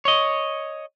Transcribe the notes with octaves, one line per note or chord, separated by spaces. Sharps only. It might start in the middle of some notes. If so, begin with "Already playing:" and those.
C#5 D#5